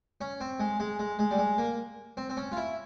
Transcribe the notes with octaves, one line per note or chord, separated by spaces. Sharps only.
C#4
C4
G#3
G#3
G#3
G#3
G3
G#3
A#3
C4
C4
C#4
F4
E4